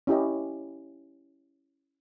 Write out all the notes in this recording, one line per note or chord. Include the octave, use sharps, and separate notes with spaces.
C#4 E4 G4 D#5